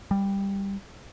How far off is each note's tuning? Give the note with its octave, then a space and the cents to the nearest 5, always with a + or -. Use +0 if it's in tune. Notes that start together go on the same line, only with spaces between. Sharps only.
G3 +10